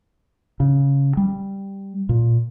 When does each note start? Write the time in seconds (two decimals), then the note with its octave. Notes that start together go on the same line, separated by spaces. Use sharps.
0.60 C#3
1.17 G3
2.09 A#2